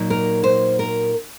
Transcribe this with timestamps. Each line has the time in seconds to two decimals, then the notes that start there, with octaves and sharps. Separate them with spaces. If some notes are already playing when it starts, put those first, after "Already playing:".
Already playing: A#2 F#3 A#3 D#4
0.10 A#4
0.44 C5
0.79 A#4